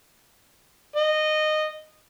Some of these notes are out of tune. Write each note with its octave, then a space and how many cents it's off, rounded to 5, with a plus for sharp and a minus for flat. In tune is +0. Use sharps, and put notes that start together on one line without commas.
D#5 -15